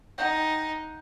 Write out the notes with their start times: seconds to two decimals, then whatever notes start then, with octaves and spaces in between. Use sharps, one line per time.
0.18 D#4 F#5 G5